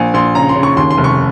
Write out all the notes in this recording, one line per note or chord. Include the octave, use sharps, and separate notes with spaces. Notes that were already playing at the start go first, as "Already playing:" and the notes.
Already playing: A#1 G#5
A#1 C6
C#3 A#5
C6
C#3
C#6
D#2 C6
C6
F1
C#6